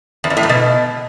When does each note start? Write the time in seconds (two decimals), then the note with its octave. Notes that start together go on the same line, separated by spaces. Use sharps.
0.24 E2
0.30 F2
0.37 A2
0.43 G#2
0.49 B2